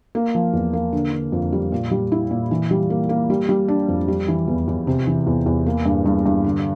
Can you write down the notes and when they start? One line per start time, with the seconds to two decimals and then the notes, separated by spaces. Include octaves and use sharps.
0.15 A#3
0.35 F3
0.53 E2
0.73 A#3
0.93 D3
1.12 D3
1.32 F2
1.53 G3
1.72 A#2
1.91 G3
2.12 E4
2.31 A#2
2.51 E3
2.71 G3
2.90 A#3
3.09 A#3
3.30 G3
3.49 G3
3.68 D4
3.88 F2
4.08 G3
4.28 E3
4.48 E2
4.68 E2
4.87 C3
5.07 E3
5.27 E2
5.46 E2
5.66 A#3
5.86 G2
6.06 G2
6.26 G2
6.44 D3